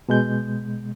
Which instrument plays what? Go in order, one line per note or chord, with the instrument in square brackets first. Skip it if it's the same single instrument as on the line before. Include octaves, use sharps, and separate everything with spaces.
[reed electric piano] B2 G#3 G6